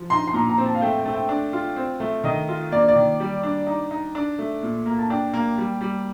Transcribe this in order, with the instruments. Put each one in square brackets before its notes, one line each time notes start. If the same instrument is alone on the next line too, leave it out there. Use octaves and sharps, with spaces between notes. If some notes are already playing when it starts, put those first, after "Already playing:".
Already playing: [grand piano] F3
[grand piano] D#4 [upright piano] C6
[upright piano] C6
[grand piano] A#2 [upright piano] A#5
[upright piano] A#5
[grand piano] C4
[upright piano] A5
F5
[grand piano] A3 [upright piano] G5
[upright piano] G5
[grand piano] A3
[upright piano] G5
[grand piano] D4
F4
C4
A3
[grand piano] D#3 [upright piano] D#5
[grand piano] F4
[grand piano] A#3 [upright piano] D5
[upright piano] D5
[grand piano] D#3
G3
D4
D#4
D#4
D4
A3
A#2
A#3
[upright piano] A5
[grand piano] D4 [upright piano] G5
[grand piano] A#3
G3
G3